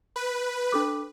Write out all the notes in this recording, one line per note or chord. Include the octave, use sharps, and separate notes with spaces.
B4
D4 A4 D6